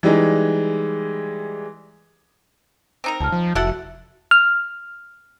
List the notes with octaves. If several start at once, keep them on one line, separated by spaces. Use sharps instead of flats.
E3 G3 G#3 D#4
C4 D#4 A#4
C#2 A5 F6
F3
F1 E4 F#4 A4 E5 F#5
F6